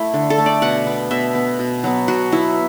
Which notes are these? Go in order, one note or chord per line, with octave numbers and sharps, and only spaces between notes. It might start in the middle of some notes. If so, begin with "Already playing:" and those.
Already playing: A3 E4
D3
A4
A3
D5
B2 F#5
B3
B2 E5
B3
B2
F#3 B3
B2 F#4
F#3 B3 E4